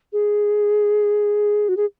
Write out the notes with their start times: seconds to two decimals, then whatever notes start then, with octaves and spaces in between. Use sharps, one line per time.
0.13 G#4
1.69 F#4
1.77 G#4